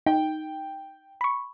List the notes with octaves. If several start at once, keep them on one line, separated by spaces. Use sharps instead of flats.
D#4 G5
B5 C#6